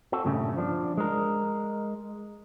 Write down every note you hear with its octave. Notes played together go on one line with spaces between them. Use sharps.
C4 F#4 A4
G2 A#2 C#3 G3 A3 C#4
F3 D4
G#3 A#4